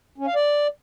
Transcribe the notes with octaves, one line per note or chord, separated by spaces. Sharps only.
C#4
F5
D5